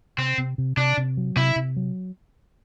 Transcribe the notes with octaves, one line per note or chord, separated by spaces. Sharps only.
C3 C4
C3
C3
C3 D4
C3
F#3
C3 E4
C3
F#3